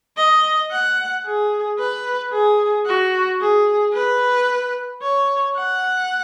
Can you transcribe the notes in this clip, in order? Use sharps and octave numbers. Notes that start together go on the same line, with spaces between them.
D#5
F#5
G#4
B4
G#4
F#4
G#4
B4
C#5
F#5